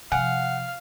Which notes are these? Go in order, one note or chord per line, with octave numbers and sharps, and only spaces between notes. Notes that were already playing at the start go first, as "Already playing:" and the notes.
C3 F3 F5 F#5 G#5